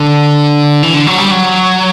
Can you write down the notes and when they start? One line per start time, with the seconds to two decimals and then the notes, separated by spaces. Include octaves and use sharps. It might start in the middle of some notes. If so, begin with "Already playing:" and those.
Already playing: D3
0.83 E3
0.94 D3
1.07 F#3
1.18 G3
1.31 F#3